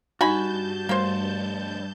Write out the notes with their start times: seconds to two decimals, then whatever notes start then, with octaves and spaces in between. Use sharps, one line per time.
0.21 G2 D#4 F#4 G#5 A5 B5 G6
0.89 G3 A3 A#3 C5